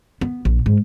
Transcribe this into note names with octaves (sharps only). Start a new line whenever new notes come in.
B3
A#1
G#2